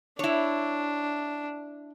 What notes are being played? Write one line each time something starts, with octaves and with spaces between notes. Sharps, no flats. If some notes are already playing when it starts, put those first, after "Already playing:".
D4 E4 C#5